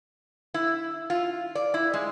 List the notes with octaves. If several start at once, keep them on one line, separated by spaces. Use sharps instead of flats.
E4
F4
D5
E4
G#3